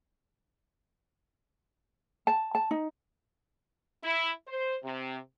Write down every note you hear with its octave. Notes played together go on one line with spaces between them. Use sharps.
A5
A5
D#4
E4
C5
C3